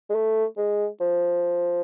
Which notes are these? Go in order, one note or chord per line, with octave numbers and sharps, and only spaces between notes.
G#3
A3
G#3
F3